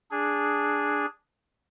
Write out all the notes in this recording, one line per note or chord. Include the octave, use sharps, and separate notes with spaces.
D4 G#4